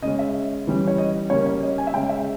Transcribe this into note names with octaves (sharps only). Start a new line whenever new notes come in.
C#3 G#3 C#4 D#5
E5
E3 G3 C#4
C#5
D#5
C#3 G3 A#3 C#4 C#5
C#5
D#5
G#5
E5
C#3 G#3 C#4 G5
E5